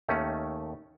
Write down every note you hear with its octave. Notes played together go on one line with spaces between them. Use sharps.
D#2 D#3 A3 C#4